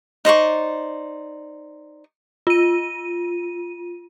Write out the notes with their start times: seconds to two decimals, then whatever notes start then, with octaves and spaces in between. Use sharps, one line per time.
0.25 D#4 C5 D5 C#6
2.47 F4 D#7